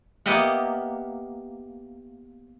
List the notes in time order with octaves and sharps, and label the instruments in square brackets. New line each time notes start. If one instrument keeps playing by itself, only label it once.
[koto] A#3 B3 G4 D#5 E5 F#5